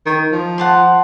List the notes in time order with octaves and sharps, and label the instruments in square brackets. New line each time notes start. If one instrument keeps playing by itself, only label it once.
[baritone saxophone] D#3
F3
[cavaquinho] F#5 A5 C6